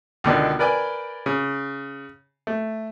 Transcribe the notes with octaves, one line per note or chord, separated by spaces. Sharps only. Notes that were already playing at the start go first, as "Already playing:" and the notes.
C#2 B2 D3 D#3 D4 D5
A#4 B4 D5 G5 G#5
C#3
A3